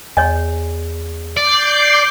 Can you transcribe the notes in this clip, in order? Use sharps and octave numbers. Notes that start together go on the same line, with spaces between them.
E2 C#5 D#5 G#5
D5 D6 G6 C7